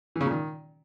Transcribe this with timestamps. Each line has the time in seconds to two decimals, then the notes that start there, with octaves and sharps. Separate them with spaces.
0.16 E3
0.21 C#3
0.26 A#2
0.31 D#3